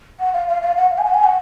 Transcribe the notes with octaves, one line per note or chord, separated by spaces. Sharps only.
F#5
F5
F5
F5
F#5
F5
G#5
F#5
G#5
F#5